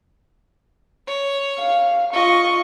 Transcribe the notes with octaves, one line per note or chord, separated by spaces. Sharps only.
C#5
F5
F4 D#5 C#6